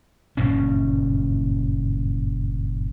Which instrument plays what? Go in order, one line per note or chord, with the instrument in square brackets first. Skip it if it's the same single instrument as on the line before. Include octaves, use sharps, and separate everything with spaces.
[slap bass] F#1 G2 A#2 C#4